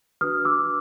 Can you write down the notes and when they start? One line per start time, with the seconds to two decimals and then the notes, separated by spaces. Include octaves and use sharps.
0.21 D4 F#4 B4 D#6 F6
0.45 D6 E6